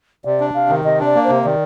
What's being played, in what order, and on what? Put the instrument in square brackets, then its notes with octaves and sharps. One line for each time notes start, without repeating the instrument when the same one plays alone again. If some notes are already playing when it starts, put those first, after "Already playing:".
[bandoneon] C3 [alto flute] D5
[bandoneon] D4
[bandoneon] C3 [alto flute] F5
[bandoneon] D#3
[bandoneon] C3 [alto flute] D#5
[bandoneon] D4
[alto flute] D5
[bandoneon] A#3
[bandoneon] C3 [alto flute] C5
[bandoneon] D#3 [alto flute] D5